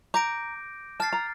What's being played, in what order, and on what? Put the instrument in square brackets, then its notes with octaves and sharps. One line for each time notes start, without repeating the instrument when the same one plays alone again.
[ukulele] A#5 [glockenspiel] D6 G6 A#6 D7
[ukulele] A5 [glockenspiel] F6 A6 C7
[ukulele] A#5